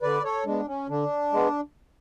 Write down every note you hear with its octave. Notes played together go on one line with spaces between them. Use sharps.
D3 B4 D5
A4 C#5
G#3 B3 D4
C#4
D3 D4
G#3 B3